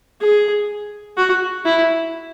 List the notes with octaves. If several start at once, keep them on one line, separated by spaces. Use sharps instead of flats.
G#4
F#4
E4